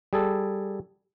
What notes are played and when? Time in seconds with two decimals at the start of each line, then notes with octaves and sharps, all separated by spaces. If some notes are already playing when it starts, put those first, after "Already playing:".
0.13 G3 G#4 A4